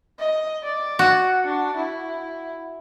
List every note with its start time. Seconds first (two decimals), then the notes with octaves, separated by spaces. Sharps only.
0.19 D#5
0.64 D5
0.99 F#4
1.45 D4
1.77 E4